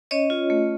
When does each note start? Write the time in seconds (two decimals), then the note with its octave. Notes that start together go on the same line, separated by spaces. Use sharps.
0.11 C#4 C#5 D#5
0.30 F4
0.50 A3